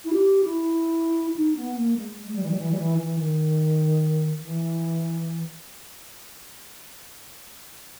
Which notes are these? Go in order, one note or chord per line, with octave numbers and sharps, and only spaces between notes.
E4
G4
E4
D#4
B3
A#3
G#3
G#3
G3
E3
G3
E3
G3
E3
E3
D#3
E3